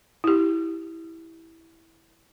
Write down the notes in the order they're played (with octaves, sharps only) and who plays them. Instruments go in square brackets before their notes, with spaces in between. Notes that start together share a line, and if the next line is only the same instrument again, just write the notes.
[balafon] E4 G4